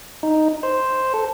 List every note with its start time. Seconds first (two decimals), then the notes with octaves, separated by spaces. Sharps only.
0.23 D#4
0.63 C5
1.14 A4